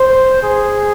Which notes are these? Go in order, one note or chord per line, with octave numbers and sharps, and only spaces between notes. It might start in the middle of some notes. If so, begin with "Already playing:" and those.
Already playing: C5
G#4